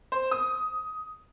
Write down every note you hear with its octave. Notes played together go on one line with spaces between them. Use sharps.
C5
D#6